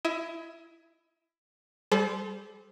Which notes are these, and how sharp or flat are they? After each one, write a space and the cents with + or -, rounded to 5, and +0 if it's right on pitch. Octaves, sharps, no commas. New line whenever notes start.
E4 +20 D#5 +45
G3 +0 A4 -45 C5 -10